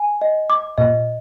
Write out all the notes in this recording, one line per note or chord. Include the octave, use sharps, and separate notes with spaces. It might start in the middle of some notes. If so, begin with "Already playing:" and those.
Already playing: G#5
D#5
D6
A#2 D#5